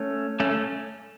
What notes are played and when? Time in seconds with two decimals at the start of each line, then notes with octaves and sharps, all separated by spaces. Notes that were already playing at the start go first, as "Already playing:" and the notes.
Already playing: A3 C#4
0.40 A3 C#4